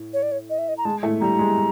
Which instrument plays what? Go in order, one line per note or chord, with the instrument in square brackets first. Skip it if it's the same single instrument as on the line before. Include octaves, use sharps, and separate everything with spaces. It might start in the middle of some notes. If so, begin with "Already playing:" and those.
Already playing: [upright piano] A2
[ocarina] C#5
D5
C#5
D#5
E5
D#5
A#5
[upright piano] G#3 [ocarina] A5
[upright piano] A2 A3
[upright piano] G3 [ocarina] A#5
[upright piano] G#3